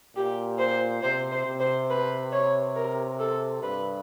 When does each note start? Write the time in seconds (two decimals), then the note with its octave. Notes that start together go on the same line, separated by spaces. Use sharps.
0.16 A#2 G4
0.59 C5
1.02 C3 C5
1.32 C5
1.46 C3
1.60 C5
1.90 B4
2.32 C#5
2.76 A#4
3.20 A4
3.63 G2 B4